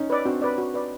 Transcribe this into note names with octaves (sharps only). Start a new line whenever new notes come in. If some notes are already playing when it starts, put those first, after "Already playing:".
Already playing: C#4 D#4
B4 D5
C4 D4 F#4
B4 D5
F#4
B4 D5